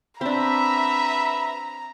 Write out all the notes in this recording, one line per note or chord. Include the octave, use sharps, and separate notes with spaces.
C4 D4 F#4 B4 E5 A#5 B5